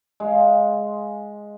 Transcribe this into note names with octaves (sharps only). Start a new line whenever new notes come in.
G#3 F5